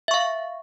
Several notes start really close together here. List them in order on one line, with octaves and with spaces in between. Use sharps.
E5 C#6 F5